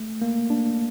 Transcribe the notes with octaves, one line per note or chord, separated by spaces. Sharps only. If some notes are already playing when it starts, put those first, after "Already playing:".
Already playing: A3
A#3
D4